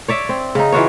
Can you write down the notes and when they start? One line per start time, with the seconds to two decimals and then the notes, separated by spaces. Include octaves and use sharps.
0.08 C#5 D5 E5
0.29 C4
0.55 C#3 D#4
0.72 E3 F4 F#4 C#5